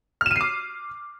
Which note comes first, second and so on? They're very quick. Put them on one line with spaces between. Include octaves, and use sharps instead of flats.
F6 E7 D#7 C7 D6